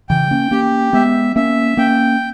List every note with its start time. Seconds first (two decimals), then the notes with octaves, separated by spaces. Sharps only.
0.09 C#3 E3 G5
0.31 A#3 C#4
0.51 A#3 C#4 G4
0.93 G#3 B3 E5
1.36 A#3 C#4 E5
1.77 A#3 C#4 G5